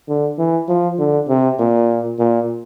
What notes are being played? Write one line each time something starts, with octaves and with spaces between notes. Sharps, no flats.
D3
E3
F3
D3
C3
A#2
A#2